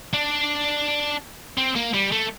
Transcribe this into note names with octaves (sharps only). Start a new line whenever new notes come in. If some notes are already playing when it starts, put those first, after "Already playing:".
D4
C4
A#3
G3
A3